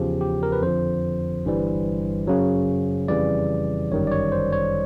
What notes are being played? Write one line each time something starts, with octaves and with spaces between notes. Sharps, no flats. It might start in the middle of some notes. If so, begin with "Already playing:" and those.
Already playing: E2 C#3 F3 G4
G4
A#4
B4
F2 D3 F3 C5
G1 G2 E3 G3
F#2 C#3 F#3
F2 C#3 E3 G3 D5
G1 F#2 D#3 G3 C#5
D5
C#5
C5
C#5